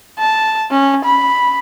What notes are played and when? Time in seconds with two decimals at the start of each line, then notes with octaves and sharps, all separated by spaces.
0.19 A5
0.71 C#4
1.04 B5